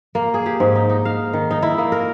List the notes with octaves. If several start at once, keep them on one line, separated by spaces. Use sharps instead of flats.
A#3
G#4
G4
G#2
D#4
D#4
F5
D#3
D#4
E4
A#3
A#4